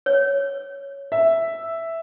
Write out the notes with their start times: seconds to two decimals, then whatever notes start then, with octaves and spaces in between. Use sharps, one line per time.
0.06 C#5
1.12 E5